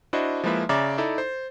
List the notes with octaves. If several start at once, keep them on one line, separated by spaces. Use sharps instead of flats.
D4 E4 F#4 C5 D#5
F3 G#3 A#3 E4 B4 E5
C#3 D5 E5 A#5 D6 A6
D#4 E4 A4 D5
C5